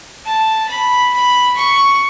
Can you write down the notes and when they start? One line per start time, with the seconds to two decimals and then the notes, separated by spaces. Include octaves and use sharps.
0.25 A5
0.68 B5
1.13 B5
1.57 C#6